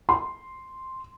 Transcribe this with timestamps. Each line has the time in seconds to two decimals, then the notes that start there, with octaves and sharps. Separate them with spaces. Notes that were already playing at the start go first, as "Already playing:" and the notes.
0.09 C6